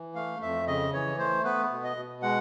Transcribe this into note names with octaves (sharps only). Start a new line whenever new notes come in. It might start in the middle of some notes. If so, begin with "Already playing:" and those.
Already playing: E3
A3 F5
F2 E5
C#3 D#5
E3 C#5
A3 C5
B3 B4
B2
D#5
B2
G#3 F#5